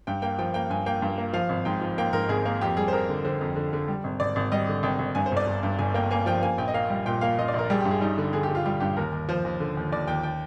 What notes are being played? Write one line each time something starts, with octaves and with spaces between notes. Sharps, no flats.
G2 G5
A#3 G5
F3 G5
A#3 G5
G2 G#5
A#3 G5
G2
A#3
F3 F5
G#1
G#2 G5
F3
A#3 G5
G#2 A#4
G#1 G#4
A#3
F2 G4
G3 G#4
C5
F2 A#4
D3
D3 C5
F2
D3
D3
G3
G#1
G#1 D5
G#1
G3 D#5
D3
G#1 G5
G#1
G2 G#5
C5
G1 D5
G1
G2
G1 G#5
A#3 G5
A#3 G#5
F3 G5
A#3 G#5
A#1 G5
D#5
A#3 F5
G3
A#2 G5
A#3 F5
A#2 D#5
D5
A#1 A#4
G3 G#4
G4
G2
G#4
G3 D#4
D3
D3 G#4
G4
D3
F4
G3 F4
G2 G4
D#2 A#4
D#2
F3 C5
D#2
D3
D#2
D#2 D5
D#2 G5
G5